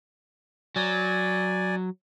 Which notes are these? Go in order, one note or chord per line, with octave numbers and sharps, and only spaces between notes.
F#3 D5 G#5